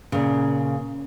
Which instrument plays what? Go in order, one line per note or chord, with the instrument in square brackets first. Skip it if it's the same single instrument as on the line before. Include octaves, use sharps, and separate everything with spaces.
[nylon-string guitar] A#2 C#3